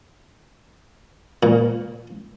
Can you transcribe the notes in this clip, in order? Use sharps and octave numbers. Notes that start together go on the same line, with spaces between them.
A#2